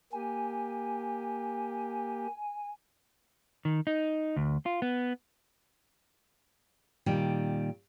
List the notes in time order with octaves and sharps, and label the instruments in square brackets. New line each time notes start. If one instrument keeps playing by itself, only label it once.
[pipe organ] A#3 G4 [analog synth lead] G#5
[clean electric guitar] D#3
D#4
D2
F4
B3
[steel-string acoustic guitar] A#2 D#3 G3